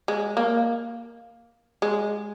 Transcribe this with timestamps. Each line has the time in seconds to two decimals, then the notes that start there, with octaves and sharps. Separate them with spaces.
0.08 G#3
0.37 A#3
1.82 G#3